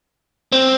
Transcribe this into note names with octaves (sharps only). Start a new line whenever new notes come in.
C4